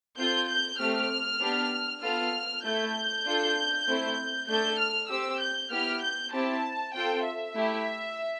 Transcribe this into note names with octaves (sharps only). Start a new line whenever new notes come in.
C4 F4 A4 G6
G6
A3 C4 G4 F6
B3 D4 G4
B3 F4 A4 F6
A3 E4 A4 G6
D4 F4 A4
A3 C4 E4
A3 D4 A4 G6
F6
C4 G4 E6
G6
B3 E4 G4 F6
G6
C4 E4 G4 A5
C4 F4 A4 G5
E5
A3 E4 G4